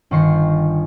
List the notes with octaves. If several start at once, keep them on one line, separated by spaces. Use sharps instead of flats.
G1 D#3 C5 C#6 C7